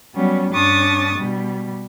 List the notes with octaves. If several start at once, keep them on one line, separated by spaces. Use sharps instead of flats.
F#3 G3 B3 C#4
G2 C#4 D4 C#6 D#6 A6
B2 G3